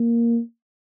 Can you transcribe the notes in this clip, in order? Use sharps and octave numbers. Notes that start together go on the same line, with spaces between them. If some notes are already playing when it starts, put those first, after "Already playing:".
Already playing: A#3